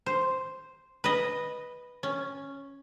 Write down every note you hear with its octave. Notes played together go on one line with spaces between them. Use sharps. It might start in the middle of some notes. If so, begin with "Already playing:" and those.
C5
B4 D#5
C#4